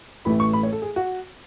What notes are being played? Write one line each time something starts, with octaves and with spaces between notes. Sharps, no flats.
A1 A2 E3 A3 B5
C#6
B5
C#5
A4
G#4
F#4